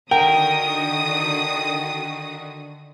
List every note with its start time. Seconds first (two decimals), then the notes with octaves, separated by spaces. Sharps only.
0.11 D3 D#3 F#4 A#4 G5 D#6